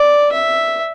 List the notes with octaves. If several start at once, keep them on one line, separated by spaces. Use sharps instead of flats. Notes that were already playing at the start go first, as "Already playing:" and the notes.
Already playing: D5
E5